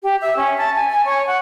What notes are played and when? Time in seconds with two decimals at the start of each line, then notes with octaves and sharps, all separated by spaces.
0.03 G4
0.21 E5
0.37 C#4
0.57 A5
0.76 G#5
0.90 G#5
1.05 C#5
1.27 F#5